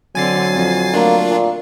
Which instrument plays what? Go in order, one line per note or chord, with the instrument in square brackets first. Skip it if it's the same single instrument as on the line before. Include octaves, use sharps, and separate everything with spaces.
[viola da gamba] D3 C4 [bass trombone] F#3 [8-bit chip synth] G#5 A6 C7
[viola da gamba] F2
[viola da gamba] A3 [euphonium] A#3 [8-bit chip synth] D4 F4
[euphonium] A#2